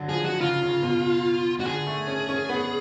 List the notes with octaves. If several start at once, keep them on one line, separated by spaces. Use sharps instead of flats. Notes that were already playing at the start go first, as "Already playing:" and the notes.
Already playing: D3 F#3
F3 G#4
F#4
C#3 F4
C#3
B2
F#4
D3 G#4
A3
C#4
C#4
B3